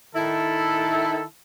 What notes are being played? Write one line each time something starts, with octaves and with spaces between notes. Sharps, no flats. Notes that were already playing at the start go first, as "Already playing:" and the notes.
D#3 E4 A4